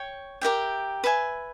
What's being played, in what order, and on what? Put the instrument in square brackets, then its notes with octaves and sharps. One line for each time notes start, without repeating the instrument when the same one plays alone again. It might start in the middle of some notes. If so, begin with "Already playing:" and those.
Already playing: [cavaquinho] C#5 G5 C#6
G4 A#4 E5 G5
B4 E5 G#5